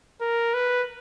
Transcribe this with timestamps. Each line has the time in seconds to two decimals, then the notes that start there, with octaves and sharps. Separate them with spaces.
0.21 A#4
0.54 B4